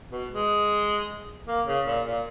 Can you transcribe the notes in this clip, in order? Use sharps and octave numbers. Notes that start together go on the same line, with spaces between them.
B2
G#3
A#3
C#3
A#2
A#2